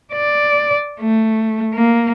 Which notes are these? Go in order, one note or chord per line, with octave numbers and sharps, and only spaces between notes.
D5
A3
A#3